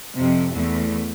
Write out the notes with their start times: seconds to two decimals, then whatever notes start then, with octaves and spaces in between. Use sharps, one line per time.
0.17 F2 C3
0.54 E2 A3